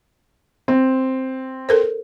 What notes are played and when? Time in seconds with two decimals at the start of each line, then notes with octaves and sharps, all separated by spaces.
0.68 C4
1.69 A4 A#4 C5